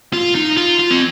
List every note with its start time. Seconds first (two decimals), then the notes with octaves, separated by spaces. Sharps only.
0.13 F4
0.35 D#4
0.57 F4
0.79 F4
0.91 C4